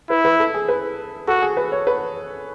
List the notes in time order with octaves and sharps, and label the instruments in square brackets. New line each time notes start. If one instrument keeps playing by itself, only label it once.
[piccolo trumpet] E4 [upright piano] B4
[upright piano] B4
A4
G#4
B4
[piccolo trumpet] F#4 [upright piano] A4
[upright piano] G#4
B4
C#5
B4